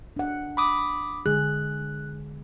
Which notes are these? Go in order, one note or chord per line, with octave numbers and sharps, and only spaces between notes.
D4 F#5
B5 D6 D#6
D3 G#3 G#4 F#6